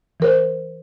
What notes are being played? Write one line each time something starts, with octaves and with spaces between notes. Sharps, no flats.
E3 A#4 C5